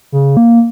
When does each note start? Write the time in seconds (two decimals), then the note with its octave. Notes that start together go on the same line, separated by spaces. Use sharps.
0.12 C#3
0.37 A#3